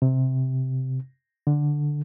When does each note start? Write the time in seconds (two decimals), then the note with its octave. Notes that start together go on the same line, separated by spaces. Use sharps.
0.02 C3
1.47 D3